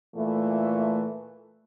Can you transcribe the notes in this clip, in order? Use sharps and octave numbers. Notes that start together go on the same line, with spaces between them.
A#2 E3 A3